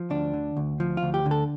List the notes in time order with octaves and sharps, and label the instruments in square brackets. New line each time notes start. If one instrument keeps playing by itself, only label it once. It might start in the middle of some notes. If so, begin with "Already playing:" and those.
Already playing: [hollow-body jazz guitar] F3
D2 D4
D3
D2
F3
F4
D2
G4
D3
A4